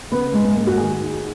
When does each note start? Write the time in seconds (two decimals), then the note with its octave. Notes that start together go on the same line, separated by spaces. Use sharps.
0.12 C#3 B3
0.33 G#2 G#3
0.45 G#3
0.55 G#2 A#3
0.67 F#4
0.77 D#3 G#4
1.00 D#3